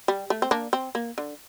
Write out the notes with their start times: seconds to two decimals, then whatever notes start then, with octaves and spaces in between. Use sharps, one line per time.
0.08 G3
0.30 A3
0.42 C4
0.51 A#3 D4
0.73 C4
0.95 A#3
1.18 D3